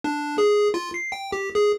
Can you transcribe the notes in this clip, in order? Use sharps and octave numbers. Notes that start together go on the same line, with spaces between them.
D4
G#4
F4
C7
G5
G4
G#4